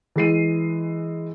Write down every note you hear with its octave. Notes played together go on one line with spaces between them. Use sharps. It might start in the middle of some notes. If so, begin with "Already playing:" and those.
E3 G#3 C7 D#7